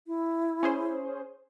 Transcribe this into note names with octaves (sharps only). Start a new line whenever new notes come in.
E4
C#4 G#4 C5